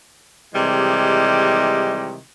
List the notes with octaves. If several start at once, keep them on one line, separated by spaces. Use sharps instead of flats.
C3 D#3 E3 G3 G#3